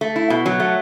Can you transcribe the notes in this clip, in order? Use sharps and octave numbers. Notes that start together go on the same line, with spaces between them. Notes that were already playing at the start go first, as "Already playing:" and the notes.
A3
E4
B2
F#3
A3